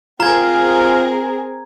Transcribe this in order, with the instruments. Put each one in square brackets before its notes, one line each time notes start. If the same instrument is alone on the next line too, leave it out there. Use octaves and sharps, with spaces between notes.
[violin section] C4 G#4 A#4 [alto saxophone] F4 [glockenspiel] A#5 G#6